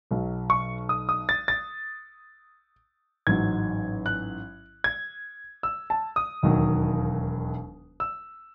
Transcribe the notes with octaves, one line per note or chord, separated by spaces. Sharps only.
B1 B2 F#3
C#6
D#6
D#6
A6
A6
A1 G#2 F#3 G#6
F#6
G#6
E6
A5
D#6
E1 D#2 D#3 F#3
E6